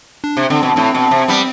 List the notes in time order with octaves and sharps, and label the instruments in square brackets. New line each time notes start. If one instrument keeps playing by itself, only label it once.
[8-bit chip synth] D4
[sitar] C3
[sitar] D3 [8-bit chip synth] C4
[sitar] B2
[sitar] A2 [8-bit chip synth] C4
[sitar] B2
C3
G3 B3